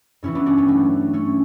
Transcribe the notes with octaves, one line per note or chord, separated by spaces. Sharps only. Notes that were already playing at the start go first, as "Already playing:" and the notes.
G2 E3 C#4 E4
B3 D4
D4 F#4
G3 B3
F#3 A3
A3 C#4